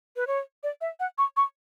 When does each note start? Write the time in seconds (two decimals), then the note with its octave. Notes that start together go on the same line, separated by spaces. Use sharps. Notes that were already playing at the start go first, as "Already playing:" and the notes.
0.16 B4
0.27 C#5
0.63 D5
0.81 E5
1.00 F#5
1.18 C#6
1.37 C#6